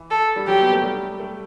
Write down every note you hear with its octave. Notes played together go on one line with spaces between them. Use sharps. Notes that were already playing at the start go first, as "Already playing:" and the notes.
Already playing: E3
A4
G3
F#3 G4
B3
A3
G3
A3